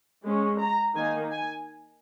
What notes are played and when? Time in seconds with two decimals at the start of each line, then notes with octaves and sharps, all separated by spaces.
0.23 G#3 C#4
0.59 A#5
0.96 D#3 A#3 D#4 G#5
1.31 G#5